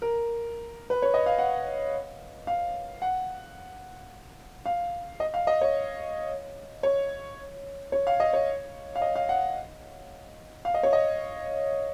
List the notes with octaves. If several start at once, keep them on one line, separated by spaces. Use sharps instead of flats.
A#4
B4
C#5
D#5
F5
F#5
F5
F#5
F5
D#5
F5
D#5
C#5
C#5
C#5
F5
D#5
C#5
F5
D#5
F5
F#5
F5
D#5
C#5
D#5